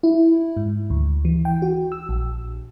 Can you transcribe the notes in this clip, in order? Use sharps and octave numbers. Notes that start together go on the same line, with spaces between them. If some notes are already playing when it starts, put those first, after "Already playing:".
E4
G#2
D2
E3
G5
F#4
E6
A#1